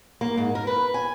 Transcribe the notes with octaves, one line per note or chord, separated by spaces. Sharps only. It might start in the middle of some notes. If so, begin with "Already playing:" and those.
A#3
G#2
A#4
B4
G#5